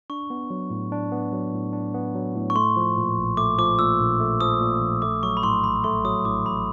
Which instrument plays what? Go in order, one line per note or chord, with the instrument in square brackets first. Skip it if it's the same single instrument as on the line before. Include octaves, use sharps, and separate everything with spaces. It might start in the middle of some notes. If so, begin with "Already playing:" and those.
[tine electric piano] D4 [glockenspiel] C#6
[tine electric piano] B3
F#3
A2
D4
B3
F#3
A2
D4
B3
F#3
A2
[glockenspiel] C#6
[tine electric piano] A3 [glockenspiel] C6
[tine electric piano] F3
A#2
A#1
[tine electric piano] A3 [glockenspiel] D6
[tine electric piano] F3 [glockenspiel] D6
[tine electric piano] A#2 [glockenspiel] E6
[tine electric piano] A#1
A3
[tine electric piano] F3 [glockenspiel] D#6
[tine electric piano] A#2
A#1
[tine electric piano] A3 [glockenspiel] D6
[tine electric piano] F#3 [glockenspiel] C#6
[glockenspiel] B5
[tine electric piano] A2 [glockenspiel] C6
[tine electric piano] A1 [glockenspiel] B5
[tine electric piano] A3 [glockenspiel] C6
[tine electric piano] F#3 [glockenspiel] D#6
[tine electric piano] A2 [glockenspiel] D6
[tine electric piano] A1 [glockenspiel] B5